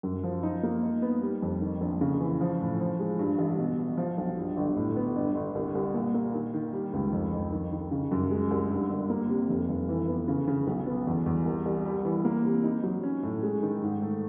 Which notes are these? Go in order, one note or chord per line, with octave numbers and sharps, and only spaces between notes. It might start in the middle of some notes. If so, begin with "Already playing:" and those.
F#2
F3
D#4
A#3
D#4
B3
G3
F2
D#3
A#1
C#3
E3
F3
A2
F3
G#3
G2
A1
B2
B2
F3
B1
G2
G1
A2
B3
G1
G1
C2
C2
A#2
A#3
D#3
D#3
G3
C#2
F2
F2
D#3
D#3
C#3
F#2
G#3
C2
G2
G1
A#3
C3
F1
F1
E3
B3
C#3
C#3
B1
B3
E2
E2
C2
C2
G3
E3
A#3
C3
D#4
F#3
C#4
A2
G#3
D#3
G#2
A3